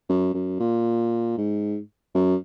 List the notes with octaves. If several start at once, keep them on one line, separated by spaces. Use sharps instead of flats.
F#2
F#2
A#2
G#2
F#2